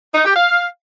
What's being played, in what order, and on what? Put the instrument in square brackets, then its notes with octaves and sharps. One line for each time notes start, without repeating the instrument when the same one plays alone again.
[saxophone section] D#4
G4
F5